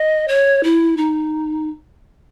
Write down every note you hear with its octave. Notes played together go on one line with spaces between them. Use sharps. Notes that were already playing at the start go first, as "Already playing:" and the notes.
Already playing: D#5
C#5
E4
D#4